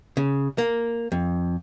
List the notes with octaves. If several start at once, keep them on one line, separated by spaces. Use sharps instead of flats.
C#3
A#3
F2